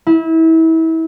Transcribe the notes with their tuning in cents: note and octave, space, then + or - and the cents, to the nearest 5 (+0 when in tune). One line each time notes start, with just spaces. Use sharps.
E4 -30